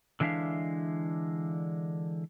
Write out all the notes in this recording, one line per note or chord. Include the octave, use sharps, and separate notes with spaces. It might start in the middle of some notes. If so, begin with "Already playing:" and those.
D3 E3 G#3 D4 E5 F5